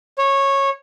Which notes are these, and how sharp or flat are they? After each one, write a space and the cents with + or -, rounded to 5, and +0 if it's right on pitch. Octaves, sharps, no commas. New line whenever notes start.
C#5 -15